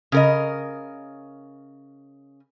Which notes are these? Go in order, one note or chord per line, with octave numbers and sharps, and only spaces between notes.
C#3 A#4 D#5